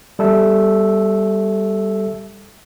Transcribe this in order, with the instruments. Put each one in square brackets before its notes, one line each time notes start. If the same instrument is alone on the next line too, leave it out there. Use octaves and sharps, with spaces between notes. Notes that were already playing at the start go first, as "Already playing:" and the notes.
[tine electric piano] G3 A4 E5